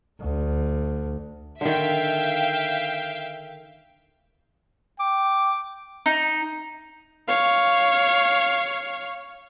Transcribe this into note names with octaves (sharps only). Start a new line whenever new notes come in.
D2
D3 D#3 E5 F5 G5
G5 D6
D#4
C#5 F5